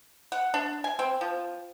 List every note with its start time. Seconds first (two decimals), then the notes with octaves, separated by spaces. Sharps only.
0.32 F#5
0.54 D4
0.84 G#5
0.99 C4
1.21 F3